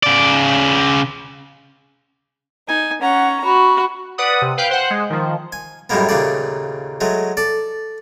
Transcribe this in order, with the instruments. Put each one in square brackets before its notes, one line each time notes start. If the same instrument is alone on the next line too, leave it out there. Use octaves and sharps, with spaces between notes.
[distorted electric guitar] C#3 D5
[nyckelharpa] D#4 G#5
[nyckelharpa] C#4 A#5 [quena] F#5
[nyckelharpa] F#4 [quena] B5
[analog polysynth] B4 D5 F#5 D#6
C3
B4 F5 G5 F#6 G6
C5 F#5
G#3
D#3 F3
[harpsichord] G#5
F#2 A2 G3 G#3 A#3 B3
D#2 A#2 C#3 A3 D5
F#3 G#3 A3
A4 D5